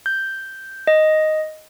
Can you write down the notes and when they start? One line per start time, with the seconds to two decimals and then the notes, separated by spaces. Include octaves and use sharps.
0.06 G6
0.87 D#5